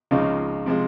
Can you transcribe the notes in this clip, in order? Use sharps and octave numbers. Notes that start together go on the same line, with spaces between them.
C#2 C#3 F3 G#3 D#4
C3 F3 G#3